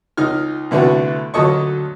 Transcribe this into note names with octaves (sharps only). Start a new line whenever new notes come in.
C#2 D#4 F6
C2 D3 A3 B3 F#4
D2 A#2 F#3 A4 D#5 C#6